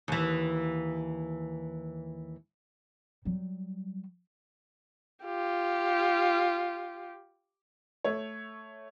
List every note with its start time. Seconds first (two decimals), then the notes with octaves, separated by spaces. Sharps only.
0.08 D#2 E3
3.25 F#3 G3
5.24 F4 G4
8.04 A3 C#5